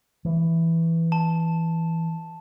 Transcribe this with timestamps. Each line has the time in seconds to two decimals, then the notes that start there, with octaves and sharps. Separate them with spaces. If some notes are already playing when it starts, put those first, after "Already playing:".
0.25 E3
1.12 A5